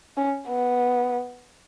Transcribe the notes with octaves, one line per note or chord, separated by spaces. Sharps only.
C#4
B3